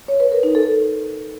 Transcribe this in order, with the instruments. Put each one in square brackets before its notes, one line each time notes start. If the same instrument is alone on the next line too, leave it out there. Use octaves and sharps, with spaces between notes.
[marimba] C#5
B4
A#4
D#4
A4